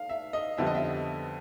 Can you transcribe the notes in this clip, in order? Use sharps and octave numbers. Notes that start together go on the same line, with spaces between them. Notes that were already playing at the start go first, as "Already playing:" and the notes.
Already playing: F5
E5
D#5
F2 D3 G3 B3 E5
D#5
E5